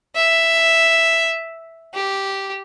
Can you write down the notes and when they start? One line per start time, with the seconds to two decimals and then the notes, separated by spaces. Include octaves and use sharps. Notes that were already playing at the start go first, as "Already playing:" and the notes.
0.16 E5
1.94 G4